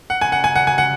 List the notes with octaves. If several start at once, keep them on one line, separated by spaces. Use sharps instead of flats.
F#5
G#5
F#5
G#5
F#5
G#5
F#5